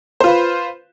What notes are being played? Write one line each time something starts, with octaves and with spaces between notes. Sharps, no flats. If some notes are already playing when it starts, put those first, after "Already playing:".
F4 B4 C5